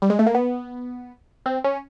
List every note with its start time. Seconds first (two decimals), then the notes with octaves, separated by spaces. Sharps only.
0.02 G3
0.10 G#3
0.19 A3
0.26 A#3
0.35 B3
1.46 C4
1.64 C#4